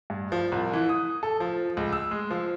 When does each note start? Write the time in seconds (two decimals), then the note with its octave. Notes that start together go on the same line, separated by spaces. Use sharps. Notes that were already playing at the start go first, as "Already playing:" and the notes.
0.10 G2
0.32 F3
0.52 C2
0.73 E3
0.89 D#6
1.23 A4
1.40 F3
1.77 C#2
1.93 E6
2.11 G#3
2.31 F3